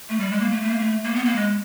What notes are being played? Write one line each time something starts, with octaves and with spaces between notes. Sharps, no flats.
A3
G3
G#3
A#3
A3
A3
A#3
A3
A#3
B3
A#3
G#3